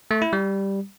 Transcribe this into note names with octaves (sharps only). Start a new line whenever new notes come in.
A3
E4
G3